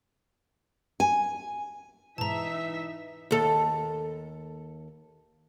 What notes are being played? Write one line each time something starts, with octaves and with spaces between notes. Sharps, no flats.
G#5
G#2 B2 E3 D#4 E5 A5 A#5
D#2 A4